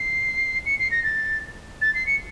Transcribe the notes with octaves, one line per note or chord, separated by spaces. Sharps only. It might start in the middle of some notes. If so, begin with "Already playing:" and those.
Already playing: C7
C#7
C7
A#6
A6
A6
C7
C#7